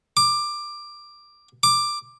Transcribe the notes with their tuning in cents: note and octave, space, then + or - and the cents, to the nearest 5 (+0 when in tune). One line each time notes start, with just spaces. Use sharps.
D6 +15
D6 +10